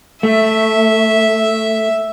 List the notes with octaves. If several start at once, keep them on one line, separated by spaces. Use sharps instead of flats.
A3 E5